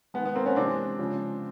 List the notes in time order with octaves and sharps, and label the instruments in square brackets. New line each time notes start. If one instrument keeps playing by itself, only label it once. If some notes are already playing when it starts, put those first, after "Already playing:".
[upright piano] G#3 B3
D#3
B3
A#3 C4
B3 C#4
C3 E3 G#3 C4 D4
C#3 F3 G#3